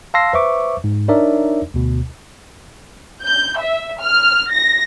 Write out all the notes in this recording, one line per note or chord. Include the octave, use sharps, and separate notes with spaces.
F5 A5 C6 E6 A#6 C7
B4 C5 E5 C#6 D6
G#2
D4 D#4 A#4 C#5 D5 E5
D2 B2
G6
E5
F6
A#6